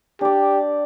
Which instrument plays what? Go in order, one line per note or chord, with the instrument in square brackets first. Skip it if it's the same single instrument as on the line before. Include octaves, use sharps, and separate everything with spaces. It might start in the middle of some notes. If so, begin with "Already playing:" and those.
[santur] D4 D5 [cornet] G4